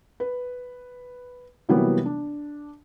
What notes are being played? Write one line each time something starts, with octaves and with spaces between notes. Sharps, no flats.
B4
C3 E3 F#3 G3 A#3 B3
D4